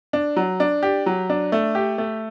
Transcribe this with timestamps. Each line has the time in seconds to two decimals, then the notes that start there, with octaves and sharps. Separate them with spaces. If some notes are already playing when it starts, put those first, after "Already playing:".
0.13 D4
0.36 F#3
0.60 D4
0.83 G4
1.06 F#3
1.30 D4
1.52 A3
1.75 G4
1.98 A3